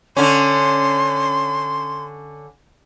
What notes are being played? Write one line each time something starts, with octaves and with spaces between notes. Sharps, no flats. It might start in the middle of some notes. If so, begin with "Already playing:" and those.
D3 C#4 C6